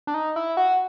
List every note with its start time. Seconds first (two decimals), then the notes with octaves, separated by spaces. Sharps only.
0.07 D4
0.14 D#4
0.36 E4
0.57 F#4